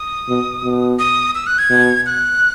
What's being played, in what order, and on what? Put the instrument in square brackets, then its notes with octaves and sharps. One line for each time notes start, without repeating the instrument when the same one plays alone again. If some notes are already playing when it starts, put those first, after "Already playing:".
Already playing: [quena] D#6
[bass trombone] B2
B2
[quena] D#6
E6
F#6
G#6
[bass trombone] B2
[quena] F#6